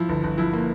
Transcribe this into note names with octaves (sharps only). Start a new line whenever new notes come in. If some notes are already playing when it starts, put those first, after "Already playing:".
Already playing: F3 E4
G1
G1
F3 E4
A#3